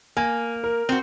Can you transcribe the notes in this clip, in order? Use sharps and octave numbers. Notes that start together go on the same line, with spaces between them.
A#3 G#5
A#4
C4 F#4